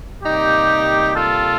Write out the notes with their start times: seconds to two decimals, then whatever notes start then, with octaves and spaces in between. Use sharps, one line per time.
0.23 C3 G3 A#3 D#4 G4
1.15 F4 A4